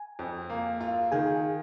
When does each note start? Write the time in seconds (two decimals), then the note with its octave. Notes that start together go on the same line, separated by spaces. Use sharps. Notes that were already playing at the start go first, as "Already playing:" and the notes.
Already playing: G#5
0.19 F2
0.50 A#3
0.81 F4
1.12 D#3 G#4 G#5